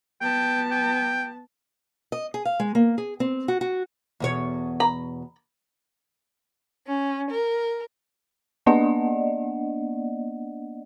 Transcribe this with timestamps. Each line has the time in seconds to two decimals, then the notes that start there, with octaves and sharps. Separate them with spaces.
0.21 B3 G5 A5
0.71 G5
2.12 D#5
2.34 G#4
2.45 F5
2.60 G#3
2.75 A#3
2.98 G#4
3.20 C4
3.48 F#4
3.61 F#4
4.20 E2 B2 C#5
4.80 A#5 B5
6.87 C#4
7.31 A#4
8.66 A#3 B3 D4 D5 D#5 F#5